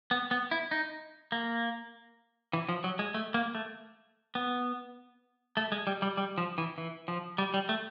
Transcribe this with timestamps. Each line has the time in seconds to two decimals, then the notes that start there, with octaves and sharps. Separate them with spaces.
0.11 B3
0.31 B3
0.51 E4
0.71 D#4
1.32 A#3
2.53 E3
2.69 F3
2.84 F#3
2.99 G#3
3.14 A3
3.34 A#3
3.55 A3
4.35 B3
5.57 A3
5.72 G#3
5.87 G3
6.02 G3
6.17 G3
6.38 F3
6.58 E3
6.78 E3
7.08 F3
7.38 G3
7.54 G3
7.69 A3